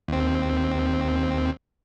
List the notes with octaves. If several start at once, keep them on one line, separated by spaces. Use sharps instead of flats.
D#2 C4